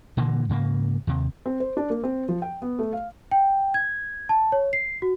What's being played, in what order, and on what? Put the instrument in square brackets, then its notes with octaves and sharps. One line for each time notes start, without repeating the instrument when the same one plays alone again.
[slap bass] A#2 D3 E3 A#3
G#2 C#3 A#3
D#2 C3
[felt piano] C4
C5
D4
A#3
C4
F3
G5
B3
A3
F5
[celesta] G5
G#6
A5
C#5
C7
F#4